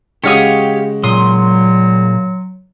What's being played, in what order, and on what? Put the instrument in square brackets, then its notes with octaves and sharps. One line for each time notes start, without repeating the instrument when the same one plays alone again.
[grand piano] C#3 G#3 F#4 [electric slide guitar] G4 [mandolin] C#5 F5 D#6
[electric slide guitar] A#2 [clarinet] F#3 [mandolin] C6 D#6